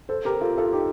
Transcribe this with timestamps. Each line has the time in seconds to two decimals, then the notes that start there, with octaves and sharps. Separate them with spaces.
0.09 A4 C5
0.25 G4 A#4
0.41 F4 A4
0.58 F4 A4
0.73 D#4 G4